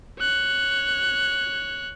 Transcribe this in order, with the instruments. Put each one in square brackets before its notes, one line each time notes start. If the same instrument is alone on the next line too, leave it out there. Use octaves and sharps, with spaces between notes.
[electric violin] C#5 F#6